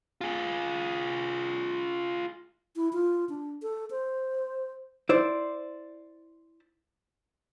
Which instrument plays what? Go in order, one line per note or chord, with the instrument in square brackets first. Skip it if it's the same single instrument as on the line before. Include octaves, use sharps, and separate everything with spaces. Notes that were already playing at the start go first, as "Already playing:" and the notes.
[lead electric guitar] F4 G#4
[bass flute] E4
F4
D4
A4
C5
[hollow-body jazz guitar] E4 C5 D5